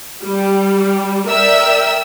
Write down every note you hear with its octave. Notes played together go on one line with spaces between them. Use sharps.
G3
A#4 D5 E5 G5 E6